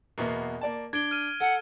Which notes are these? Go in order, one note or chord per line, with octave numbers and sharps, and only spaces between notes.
E2 B2 A#3
A#3 D5 A5
D4 G#6 D7 G7
F6 D#7
A4 F#5